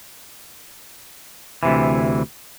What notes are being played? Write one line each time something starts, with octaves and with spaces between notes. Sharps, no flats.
D2 C3 E3